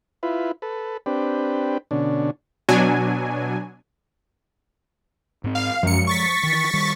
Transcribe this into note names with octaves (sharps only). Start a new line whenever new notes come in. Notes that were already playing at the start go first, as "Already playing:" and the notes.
E4 F4 B4
A4 B4
C4 D4 G4 B4
B2 D3 C#4 D4
B2 F#3 D4 G#5
G#2 C4
F5
F#2 F3 G#3 C#7
C#6 A6 B6
D#3 E3
D#3 G3